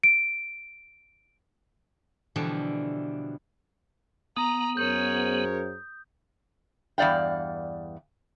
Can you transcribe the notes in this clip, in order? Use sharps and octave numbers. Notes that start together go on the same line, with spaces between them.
D7
B2 D3 E3 F3 G3
B3 A#5 D#6
F#2 G#4 A#4 C5 C#5 G6
E2 G2 D5 F5 G5